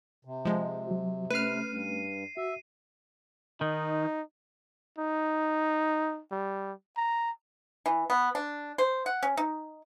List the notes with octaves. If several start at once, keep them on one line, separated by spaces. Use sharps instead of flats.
C3
F3 G#3
F#3 F#4
A3 C#4 B4 F6 C7 D#7
G2
F#4 E5
D#3 D#4
D#4
G3
A#5
E3
B3
D4
C5
F#5
C#4
D#4